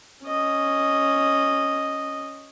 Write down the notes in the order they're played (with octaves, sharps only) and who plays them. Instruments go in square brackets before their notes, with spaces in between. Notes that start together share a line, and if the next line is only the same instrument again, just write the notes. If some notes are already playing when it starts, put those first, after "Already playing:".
[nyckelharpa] C#4 D#5